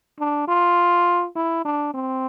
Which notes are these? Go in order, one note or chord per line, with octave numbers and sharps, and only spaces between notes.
D4
F4
E4
D4
C4